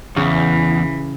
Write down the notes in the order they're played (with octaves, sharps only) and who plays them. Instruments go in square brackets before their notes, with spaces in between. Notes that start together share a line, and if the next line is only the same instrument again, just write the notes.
[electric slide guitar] E2 [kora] C#3 [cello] E3